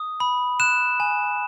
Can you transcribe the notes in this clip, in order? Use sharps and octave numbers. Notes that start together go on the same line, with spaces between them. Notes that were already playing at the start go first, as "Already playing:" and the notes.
Already playing: D#6
B5
F#6 E7
G#5